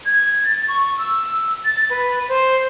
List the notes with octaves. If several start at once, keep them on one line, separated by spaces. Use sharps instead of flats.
G#6
A6
C#6
E6
A6
B4
C5